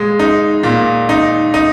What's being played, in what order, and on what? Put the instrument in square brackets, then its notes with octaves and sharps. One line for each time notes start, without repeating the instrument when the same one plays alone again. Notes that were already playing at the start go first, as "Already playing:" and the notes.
Already playing: [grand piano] A#2 G#3
D#4
A#2
D#4
D#4